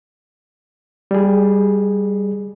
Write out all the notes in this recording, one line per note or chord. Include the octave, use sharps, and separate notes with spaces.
G3 G#4